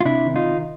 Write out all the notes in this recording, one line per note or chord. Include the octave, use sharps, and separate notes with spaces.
F4
C3 D4 E4
D#3
D#4 F4
D#3